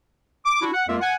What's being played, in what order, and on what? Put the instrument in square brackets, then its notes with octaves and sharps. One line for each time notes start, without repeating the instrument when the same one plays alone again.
[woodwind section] D6
D4 E4 F#4
F#5
F2 G#3 A#3 F4 A#4 E5
F#5 G#5